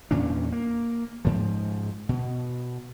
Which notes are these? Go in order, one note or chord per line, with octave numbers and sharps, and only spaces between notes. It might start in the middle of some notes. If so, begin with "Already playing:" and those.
E2 A#2 C#4 D4
A#3
G#2 F3
B2